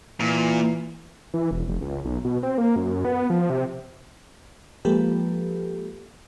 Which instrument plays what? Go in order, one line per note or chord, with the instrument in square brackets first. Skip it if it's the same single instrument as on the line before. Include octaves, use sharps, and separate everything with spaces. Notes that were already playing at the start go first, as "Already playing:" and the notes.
[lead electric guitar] A#2 [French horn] E3
[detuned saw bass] E3
E1
F1
C#2
B1
B2
C4
A#3
F#2
B3
F3
C3
[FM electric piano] F3 G#3 A#3 G4 A4 B4